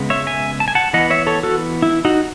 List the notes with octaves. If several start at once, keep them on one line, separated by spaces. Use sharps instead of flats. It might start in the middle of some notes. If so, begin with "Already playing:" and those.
Already playing: C#3 G#3 B3
C#5 E5
E5 G#5
A5
G#5
F#5 A5
E3 B3 D#5 F#5
C#5 E5
A4 C#5
F#4 A4
E4
D#4 F#4